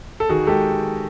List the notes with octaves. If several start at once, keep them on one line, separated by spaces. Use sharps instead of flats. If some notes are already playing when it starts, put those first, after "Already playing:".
A4
D#3 F#4 G#4
G#3 G4 A4